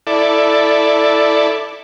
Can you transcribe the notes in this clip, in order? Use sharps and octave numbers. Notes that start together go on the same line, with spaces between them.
E4 A4 D5